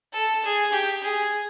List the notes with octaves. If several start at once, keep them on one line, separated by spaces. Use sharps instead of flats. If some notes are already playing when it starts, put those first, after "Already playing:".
A4
G#4
G4
G#4